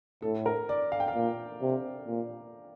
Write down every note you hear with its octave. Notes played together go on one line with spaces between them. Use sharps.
A2 A4
A#4
D5
F5
G5
F5
A#2
C3
A#2